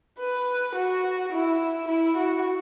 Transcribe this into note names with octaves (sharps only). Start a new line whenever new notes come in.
B4
F#4
E4
E4
F#4